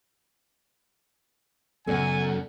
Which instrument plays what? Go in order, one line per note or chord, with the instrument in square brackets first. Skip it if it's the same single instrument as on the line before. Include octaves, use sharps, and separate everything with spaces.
[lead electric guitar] F#2 [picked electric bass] C#3 B3 [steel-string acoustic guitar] A4 D5 F#5 [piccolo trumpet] G#5